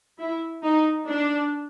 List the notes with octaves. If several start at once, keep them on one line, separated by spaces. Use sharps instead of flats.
E4
D#4
D4